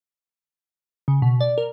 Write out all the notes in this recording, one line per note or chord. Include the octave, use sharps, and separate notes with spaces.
C#3
B2
D5
A#4